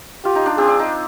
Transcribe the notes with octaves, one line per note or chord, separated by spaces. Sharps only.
F4 G4
D#4
D4
C4 G#4
D4
D#4